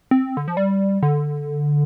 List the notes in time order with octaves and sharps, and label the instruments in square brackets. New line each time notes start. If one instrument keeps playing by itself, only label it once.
[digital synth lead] C4
D3
F3
G3
D3